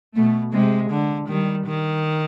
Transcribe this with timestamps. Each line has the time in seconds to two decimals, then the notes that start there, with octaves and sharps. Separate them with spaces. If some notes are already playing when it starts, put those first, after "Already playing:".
0.15 B2 A3
0.53 C3 G#3
0.91 D3
1.28 D#3 G3
1.66 D#3